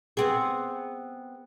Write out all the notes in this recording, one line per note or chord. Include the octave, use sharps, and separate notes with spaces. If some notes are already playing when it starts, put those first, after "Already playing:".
B3 C4 G#4